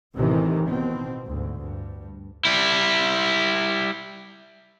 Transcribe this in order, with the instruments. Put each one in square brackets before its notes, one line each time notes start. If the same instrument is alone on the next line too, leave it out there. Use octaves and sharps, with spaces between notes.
[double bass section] A1 C3 D#3 E3
B2 C4
D2 G#2
G2
[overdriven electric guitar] G3 E4